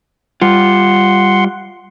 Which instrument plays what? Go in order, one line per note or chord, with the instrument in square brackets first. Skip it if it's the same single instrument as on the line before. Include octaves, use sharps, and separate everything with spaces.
[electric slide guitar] G3 F4 [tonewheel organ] F#5 C6